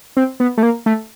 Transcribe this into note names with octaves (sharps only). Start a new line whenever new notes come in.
C4
B3
A3
A#3
A3